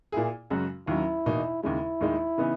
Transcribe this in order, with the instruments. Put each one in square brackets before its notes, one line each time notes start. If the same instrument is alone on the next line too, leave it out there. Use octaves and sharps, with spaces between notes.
[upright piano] A#2 A#3 E4 G#4
F#2 C#3 G#3 C#4 F#4
[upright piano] D#2 D#3 F#3 C#4 [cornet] E4
[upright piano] E2 B2 A#3 D#4
[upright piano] D#2 C#3 G#3 [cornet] E4
[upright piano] D#2 D#3 G#3 D#4
C#3 E3 B3 D#4